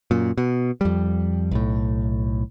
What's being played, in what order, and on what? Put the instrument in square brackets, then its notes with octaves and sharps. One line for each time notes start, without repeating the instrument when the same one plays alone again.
[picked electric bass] F#2 A#2
B2
F2 G3
B1 A2